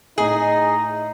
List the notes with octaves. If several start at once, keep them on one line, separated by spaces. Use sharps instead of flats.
A2 D#4 G#4 D#5 F#7